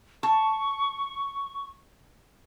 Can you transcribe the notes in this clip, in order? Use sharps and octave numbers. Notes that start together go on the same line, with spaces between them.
A5 C#6